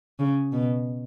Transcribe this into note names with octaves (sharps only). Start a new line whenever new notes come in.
C#3
B2